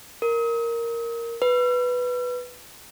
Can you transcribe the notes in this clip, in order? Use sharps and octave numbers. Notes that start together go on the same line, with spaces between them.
A#4
B4